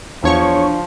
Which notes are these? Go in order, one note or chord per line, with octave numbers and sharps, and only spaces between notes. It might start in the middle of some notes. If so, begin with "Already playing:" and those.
E2 F3 D4 C#5 C#6